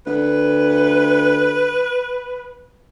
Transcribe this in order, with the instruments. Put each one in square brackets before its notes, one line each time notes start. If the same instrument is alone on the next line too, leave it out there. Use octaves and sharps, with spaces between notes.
[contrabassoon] D2 [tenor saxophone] B4